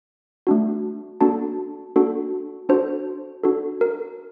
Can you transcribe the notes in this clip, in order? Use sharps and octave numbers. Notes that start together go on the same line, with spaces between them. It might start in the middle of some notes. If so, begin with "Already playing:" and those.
A3 D4 F#4
A#3 D4 F#4 A4 A5
A#3 D4 F#4 A4
D4 F#4 A4 C5
D4 F#4 A4
A#4